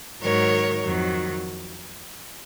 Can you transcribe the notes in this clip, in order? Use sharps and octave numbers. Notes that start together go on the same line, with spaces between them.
G#2 D#3 F#3 A#4 C#5
F2 D#3 F#3